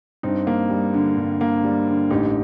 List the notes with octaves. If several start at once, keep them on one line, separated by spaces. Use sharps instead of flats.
G2 C4 D#4
A#3
G3
D3
G2
A#3
G3
D3
A1 D#4 G4